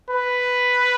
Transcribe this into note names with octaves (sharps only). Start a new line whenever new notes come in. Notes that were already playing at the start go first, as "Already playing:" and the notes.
B4